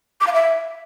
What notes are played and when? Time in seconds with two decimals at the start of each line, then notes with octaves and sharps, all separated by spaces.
0.21 D6
0.27 F5
0.33 E5